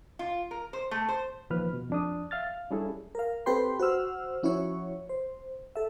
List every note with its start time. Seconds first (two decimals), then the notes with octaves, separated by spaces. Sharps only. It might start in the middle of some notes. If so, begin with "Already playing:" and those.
0.19 F4
0.51 A#4
0.73 C5
0.91 A3
1.09 C5
1.50 E2 A#2 D#3 F3 B4 F6
1.73 B2
1.90 F2 D4 D#6
2.31 E5 F5 F6 A6
2.47 F5
2.71 G3 C#4 D4 E4 G#4 A4
3.15 A#4 F5
3.46 C4 G4 A4 B4 G5 C6
3.79 F#4 C5 F#5 E6 F6
4.43 F3 C#4 E4 F#4 C#5
5.09 C5
5.75 A4 E5